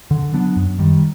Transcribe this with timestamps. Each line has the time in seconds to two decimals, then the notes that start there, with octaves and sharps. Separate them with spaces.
0.11 D3
0.33 F#3 B3 D4
0.56 F#2
0.79 D#3 G3